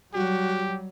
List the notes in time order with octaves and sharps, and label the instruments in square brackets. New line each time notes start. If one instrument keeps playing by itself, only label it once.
[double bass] F#3 G3 [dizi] F#4 [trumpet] G4